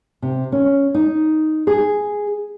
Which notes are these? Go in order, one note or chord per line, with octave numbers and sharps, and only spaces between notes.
C3
C#4
D#4
G#4